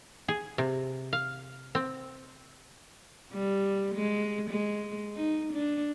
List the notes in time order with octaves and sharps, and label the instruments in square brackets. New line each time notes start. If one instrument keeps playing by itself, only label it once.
[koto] G#4
C3
F5
C4
[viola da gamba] G3
G#3
G#3
D#4
D4